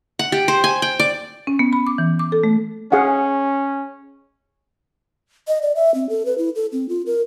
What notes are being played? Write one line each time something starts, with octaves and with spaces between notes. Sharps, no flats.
F#5
G4
C5
G#5
G5
D5
C#4
B3
B5
D6
E3
D6
A4
A3
C#4 G#4 F5 F#5
D#5
D5
E5
C4
A4
B4
E4
A4
C4
F4
A#4